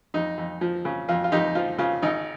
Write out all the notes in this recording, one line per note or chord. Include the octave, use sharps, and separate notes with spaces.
F2 D#4
F2
F3
C#3
F2 F4
F4
F2 D#4 G4
F3 F4
C#3 F4
G#1 D#4